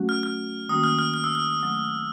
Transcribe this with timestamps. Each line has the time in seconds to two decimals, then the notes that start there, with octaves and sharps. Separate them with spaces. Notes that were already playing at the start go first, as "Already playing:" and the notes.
Already playing: F#3 A3 C#4 F#4
0.09 F6
0.23 F6
0.68 D#3 G3 A#3 C#4 F#4 D#6
0.84 F6
0.99 F6
1.14 F6
1.24 E6
1.35 F6
1.60 F#3 A3 C4